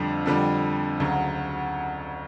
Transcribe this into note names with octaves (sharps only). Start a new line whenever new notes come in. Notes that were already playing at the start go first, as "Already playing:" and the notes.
Already playing: F2 D3 G3
F2 D3 G3
D2 C#3 F#3